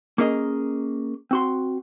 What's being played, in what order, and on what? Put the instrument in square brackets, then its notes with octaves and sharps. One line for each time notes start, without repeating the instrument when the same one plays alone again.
[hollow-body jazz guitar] A#3 C#4 G#4 A#4 D#5
C4 F#4 C6